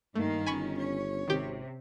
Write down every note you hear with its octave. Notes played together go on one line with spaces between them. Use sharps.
G2 D#3 A3 A#3 D#4 F5
G1 C#4 G#5 B5 C#6
C#5
G#1 C3 D#3 G4